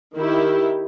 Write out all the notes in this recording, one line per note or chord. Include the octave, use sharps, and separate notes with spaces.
D#3 E4 G4